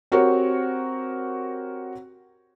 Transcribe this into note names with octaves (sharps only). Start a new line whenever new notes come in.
C4 F#4 G4 A#4 C#5